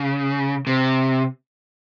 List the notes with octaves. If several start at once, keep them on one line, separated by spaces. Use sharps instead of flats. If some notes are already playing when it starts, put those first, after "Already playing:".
Already playing: C#3
C3